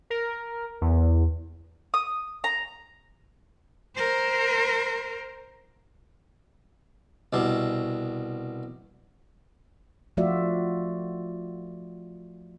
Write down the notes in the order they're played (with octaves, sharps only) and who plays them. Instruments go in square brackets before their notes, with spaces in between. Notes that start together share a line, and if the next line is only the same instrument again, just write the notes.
[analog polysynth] A#4
E2
[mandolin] D#6
A#5
[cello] A#4 C5
[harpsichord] C2 B2
[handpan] F3 A3 F4 F#4 D5 E5